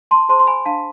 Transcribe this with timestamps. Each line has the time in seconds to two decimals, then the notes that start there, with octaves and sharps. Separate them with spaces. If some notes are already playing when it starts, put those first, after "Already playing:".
0.11 A5 C6
0.29 G#4 C5 A5 C6
0.39 C6
0.47 G#5 B5
0.65 D4 F5 A5